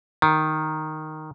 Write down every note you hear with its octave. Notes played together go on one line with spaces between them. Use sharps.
D#3